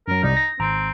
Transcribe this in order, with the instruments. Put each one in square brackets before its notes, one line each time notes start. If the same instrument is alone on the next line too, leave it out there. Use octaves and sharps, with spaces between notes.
[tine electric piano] F#2 F#3 [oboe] A#4
[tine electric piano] C2 C3 D5 [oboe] D#4
[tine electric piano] A#6
[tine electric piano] G#1 A#5 [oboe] C4